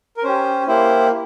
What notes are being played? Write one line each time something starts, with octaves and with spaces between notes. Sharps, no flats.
A#4
C#4 G4 C5
A#3 E4 G4 C5